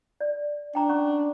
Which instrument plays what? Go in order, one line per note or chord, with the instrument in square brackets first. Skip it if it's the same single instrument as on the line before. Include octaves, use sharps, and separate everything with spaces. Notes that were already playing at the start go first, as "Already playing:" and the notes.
[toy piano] D5
[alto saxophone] D4 [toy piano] G5 A#5
[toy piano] C#4 C#6